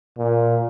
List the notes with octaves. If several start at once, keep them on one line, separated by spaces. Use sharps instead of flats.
A#2